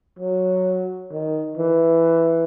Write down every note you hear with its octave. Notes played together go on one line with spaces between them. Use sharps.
F#3
D#3
E3